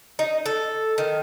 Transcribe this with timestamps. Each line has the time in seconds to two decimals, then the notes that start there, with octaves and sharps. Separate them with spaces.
0.19 D#4
0.46 A4
0.98 D#3